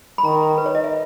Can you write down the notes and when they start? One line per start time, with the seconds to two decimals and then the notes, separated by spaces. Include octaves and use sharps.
0.18 B5
0.24 D#3 A#5
0.58 B4
0.66 C#5
0.75 D#5
0.84 E5